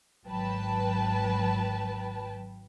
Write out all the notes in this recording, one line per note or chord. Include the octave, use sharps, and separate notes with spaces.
G#1 F#3 B4 G5 A5